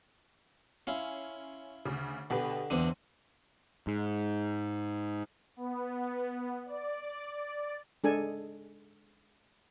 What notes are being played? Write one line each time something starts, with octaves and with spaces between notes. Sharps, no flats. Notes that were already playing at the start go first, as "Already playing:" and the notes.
C#4 E4 F4
D2 C#3
B2 D3 G4 B4
G1 E2 C4 D4 D#7
G#2
B3
D5
G#3 D4 A4 G#5